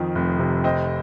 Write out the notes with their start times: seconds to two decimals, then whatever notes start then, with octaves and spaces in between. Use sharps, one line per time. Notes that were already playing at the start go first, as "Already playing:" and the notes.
Already playing: F2 D#3 F3
0.15 F1
0.39 C3
0.64 C4 D#5